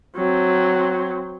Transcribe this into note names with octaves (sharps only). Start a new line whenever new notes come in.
F#3 C4